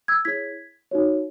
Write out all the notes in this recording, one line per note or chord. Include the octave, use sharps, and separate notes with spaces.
E6 G#6
E4 G#4 C#5 G#6 B6
D#4 F#4 C#5